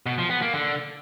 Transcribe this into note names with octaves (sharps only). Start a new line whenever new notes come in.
B2
F3
B3
A#3
D3